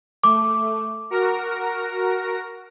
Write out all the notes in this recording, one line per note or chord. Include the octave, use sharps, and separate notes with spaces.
A3 D6
F#4 A#4 A#6